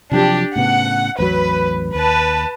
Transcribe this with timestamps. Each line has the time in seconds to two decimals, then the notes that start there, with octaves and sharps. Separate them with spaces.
0.11 C3 F3 F#3 D4 G4
0.56 A2 C#3 B3 F#5
1.18 A1 E2 F#3 B4
1.95 D#2 B4 A5